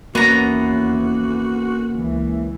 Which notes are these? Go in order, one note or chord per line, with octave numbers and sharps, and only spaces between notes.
D#2 E3 A#3 B3 C#4 F#4 A#5
C#2 E3